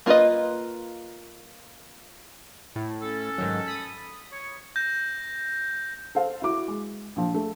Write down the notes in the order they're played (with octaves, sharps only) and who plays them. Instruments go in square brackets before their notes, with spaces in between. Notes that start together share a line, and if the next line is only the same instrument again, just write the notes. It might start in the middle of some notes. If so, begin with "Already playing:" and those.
[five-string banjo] A#3 F4 A#4 B4 D#5
[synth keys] A2
[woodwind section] C#4 A4
[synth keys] G#2 D#3 F#3
B5 D#6
[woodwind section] C#5
[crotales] G6 A#6
[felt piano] A4 C5 F5
E4 F#4 D6
G#3
A#1 F3
A3